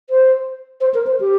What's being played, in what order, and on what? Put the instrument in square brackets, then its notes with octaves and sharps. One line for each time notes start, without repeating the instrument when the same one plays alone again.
[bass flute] C5
C5
A#4
C5
G4